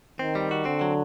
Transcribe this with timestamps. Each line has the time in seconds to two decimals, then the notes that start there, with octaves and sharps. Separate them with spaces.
0.19 D#3 C4
0.35 G3
0.51 F#4
0.65 D3 C4
0.81 F#3